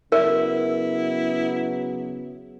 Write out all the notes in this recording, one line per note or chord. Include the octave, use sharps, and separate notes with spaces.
C#3 F#3 B3 E4 A#4 E5